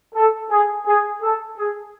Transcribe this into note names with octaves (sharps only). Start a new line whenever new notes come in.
A4
G#4
G#4
A4
G#4